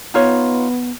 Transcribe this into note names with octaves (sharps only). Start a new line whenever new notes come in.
B3 D#4 F4 C#5